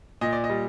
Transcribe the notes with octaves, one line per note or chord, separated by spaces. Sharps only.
A#2 D#5
D5
D#5
G3